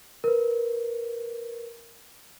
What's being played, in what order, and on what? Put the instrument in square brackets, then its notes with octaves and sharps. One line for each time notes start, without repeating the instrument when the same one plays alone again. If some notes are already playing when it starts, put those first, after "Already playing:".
[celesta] A#4 B4